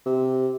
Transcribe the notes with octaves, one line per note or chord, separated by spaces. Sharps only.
C3